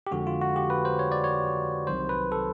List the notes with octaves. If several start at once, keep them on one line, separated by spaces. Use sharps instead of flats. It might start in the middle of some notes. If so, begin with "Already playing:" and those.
G4
F2 D3 F3 G#3 F#4
F4
F#4
G4
B4
C5
C#5
D5
C#5
C2 C3 D#3 F#3 C5
B4
A4